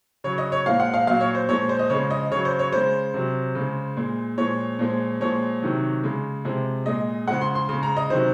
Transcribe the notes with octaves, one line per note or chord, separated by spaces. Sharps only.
C#3 F#3 C#5
D#5
C#5
A#2 F3 G#3 F5
F#5
F5
A#2 F#3 F5
C#5
C5
A#2 F3 G#3 C#5
C5
D#5
C#3 F3 G#3 C#5
D#5
C#3 F#3 C#5
C5
C#5
C#3 G#3 C5
C3 F#3
C#3 G#3
A#2 G#3
A#2 F3 G#3 C#5
A#2 F3 G#3
A#2 F3 G#3 C#5
C3 D#3 F#3
C#3 G#3
C3 F3 G#3
A#2 G#3 D#5
C#3 F3 G#3 F#5
C6
C6
C#3 G#3 C6
A#5
D#5
C3 D#3 F#3 C5